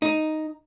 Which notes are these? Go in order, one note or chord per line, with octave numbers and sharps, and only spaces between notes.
D#4